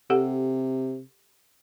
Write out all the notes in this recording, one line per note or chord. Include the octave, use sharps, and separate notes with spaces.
C3 G4 A4 F#5